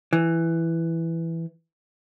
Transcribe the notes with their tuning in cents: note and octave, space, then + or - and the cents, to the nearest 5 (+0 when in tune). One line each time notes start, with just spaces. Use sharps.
E3 +5